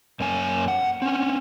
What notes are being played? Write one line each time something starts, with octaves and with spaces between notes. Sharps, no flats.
F#2 A#3 C#4 G#5
F#5
C4 C#4